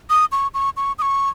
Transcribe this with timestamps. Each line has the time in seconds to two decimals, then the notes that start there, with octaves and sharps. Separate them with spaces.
0.10 D#6
0.32 C#6
0.54 C#6
0.77 C#6
0.99 D#6
1.02 C#6